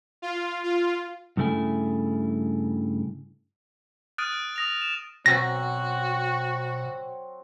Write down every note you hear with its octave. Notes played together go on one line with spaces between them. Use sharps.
F4
F4
G2 C#3 A3 E4 G#5
D#6 F6 F#6 A6 D7 D#7
D#6 A#6 F7
E7
B2 F#3 C4 F#4 A#6